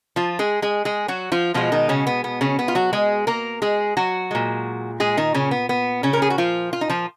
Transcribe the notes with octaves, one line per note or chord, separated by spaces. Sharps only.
F3 F4
G#3 G#4
G#3 G#4
G#3 G#4
F#3 F#4
F3 F4
B2 F3 G#3 F4
D#3 D#4
C#3 C#4
B3
B3
C#3 C#4
B3
F4
F#3 F#4
G#3 G#4
A#3 A#4
G#3 G#4
F#3 F#4
A#2 G#3
G#3 G#4
D#3 D#4
C#3 C#4
B3
B3
C#3 C#4
A#4
G#4
F#4
F3 F4
F4
D#4
F3 F4